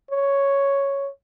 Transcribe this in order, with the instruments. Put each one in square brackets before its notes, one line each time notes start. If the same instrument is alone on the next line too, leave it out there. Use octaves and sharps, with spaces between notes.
[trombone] C#5